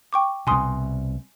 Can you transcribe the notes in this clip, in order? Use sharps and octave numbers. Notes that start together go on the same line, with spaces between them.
G5 C#6 D6
C2 B2 G#5 C6 D#6